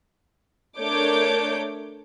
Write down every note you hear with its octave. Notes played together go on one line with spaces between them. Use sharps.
A3 D4 A#4 C#5 D6 G6